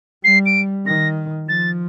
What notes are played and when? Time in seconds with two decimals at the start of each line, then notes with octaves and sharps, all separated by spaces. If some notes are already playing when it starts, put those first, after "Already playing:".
0.24 G3 C7
0.46 D7
0.86 D#3 A#6
1.49 F3 A6